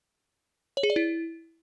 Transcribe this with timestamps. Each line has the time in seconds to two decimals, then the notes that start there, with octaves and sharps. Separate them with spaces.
0.77 C#5
0.83 G#4
0.90 D5
0.96 E4